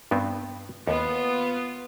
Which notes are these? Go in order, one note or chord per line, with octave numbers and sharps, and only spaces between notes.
G2 B3 C4
D#2 B3 F4